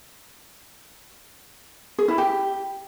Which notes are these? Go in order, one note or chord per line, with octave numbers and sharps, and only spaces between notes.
G#4
E4
G4